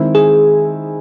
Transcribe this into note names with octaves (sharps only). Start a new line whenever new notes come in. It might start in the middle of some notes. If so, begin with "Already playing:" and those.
Already playing: D#3 G#3 C4 E4
G#4